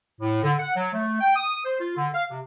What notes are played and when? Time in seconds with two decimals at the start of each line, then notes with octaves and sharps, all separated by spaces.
0.21 A2
0.43 D3
0.59 F#5
0.76 F#3
0.94 A3
1.21 G5
1.36 D#6
1.65 C5
1.80 F4
1.97 D3
2.15 F5
2.31 C3